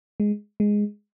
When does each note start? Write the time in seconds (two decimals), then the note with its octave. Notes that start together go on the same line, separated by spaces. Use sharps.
0.20 G#3
0.60 G#3